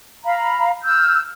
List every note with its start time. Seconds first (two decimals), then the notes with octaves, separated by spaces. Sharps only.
0.24 F5 A#5 B5
0.83 E6 F6 G6